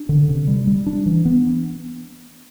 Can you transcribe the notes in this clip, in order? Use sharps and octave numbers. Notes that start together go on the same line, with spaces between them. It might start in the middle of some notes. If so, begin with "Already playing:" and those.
Already playing: D4
D3
C3
G3
G3
D4
E3
B3